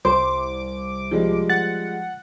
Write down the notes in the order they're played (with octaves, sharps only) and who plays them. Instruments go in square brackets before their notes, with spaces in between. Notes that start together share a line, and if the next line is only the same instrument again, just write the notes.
[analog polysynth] C2 D6 [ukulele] C5
[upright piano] F3 G3 G#3
[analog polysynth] F#5 [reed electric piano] A6